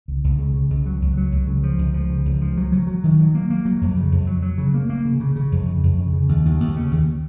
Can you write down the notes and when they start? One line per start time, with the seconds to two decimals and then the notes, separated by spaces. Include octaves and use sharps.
0.08 C#2
0.24 C#2
0.39 C#3
0.54 C#3
0.70 C#2
0.86 F#3
1.01 C#2
1.17 F#3
1.32 C#2
1.47 C#3
1.63 F3
1.79 C#2
1.94 F3
2.10 C#3
2.25 C#2
2.41 F3
2.57 F#3
2.72 F#3
2.87 F#3
3.04 D#3
3.19 F#3
3.35 A#3
3.50 A#3
3.65 F#3
3.81 F2
3.96 C#3
4.12 F2
4.27 F#3
4.42 F#3
4.58 C#3
4.74 A#3
4.90 A#3
5.05 C#3
5.20 C#3
5.36 C#3
5.52 F2
5.68 C#3
5.83 F2
5.99 C#3
6.13 C#3
6.29 D#2
6.45 D#2
6.60 D#2
6.76 C#3
6.91 D#2